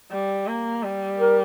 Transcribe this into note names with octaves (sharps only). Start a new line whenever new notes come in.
G3
A#3
G3
A#4